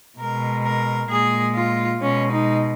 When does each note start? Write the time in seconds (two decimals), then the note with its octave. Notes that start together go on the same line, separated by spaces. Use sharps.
0.18 B2 G#3 A#4
0.64 A#4
1.09 A#2 G#3 G#4
1.55 F4
2.01 B2 G#3 C#4
2.31 D#4